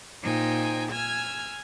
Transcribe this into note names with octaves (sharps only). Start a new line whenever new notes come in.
A#2 D#4 C5 G5 G#5
G#5 E6 F6 G#6